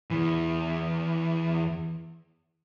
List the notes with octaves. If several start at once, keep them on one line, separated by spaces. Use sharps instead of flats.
E2 E3